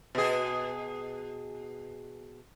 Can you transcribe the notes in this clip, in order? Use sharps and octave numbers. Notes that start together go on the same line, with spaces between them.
B2 G#4